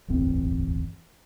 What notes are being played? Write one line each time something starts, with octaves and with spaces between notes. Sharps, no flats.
D1 G1 E2 C4